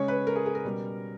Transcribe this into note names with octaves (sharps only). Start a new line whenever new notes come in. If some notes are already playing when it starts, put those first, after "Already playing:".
Already playing: C#3 G#3 C#4 C#5
B4
A#4
G#4
G#4
A#4
B2 G3 C#4